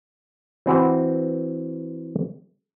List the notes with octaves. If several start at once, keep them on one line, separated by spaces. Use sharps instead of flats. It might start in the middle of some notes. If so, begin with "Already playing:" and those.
E3 C4 F#4